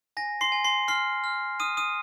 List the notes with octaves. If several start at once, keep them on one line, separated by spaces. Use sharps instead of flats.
G#5 A#6
C6 C7
G#5
C6 C7
C6 F6 C7
F6
D#6 F6 D#7
D#6 D#7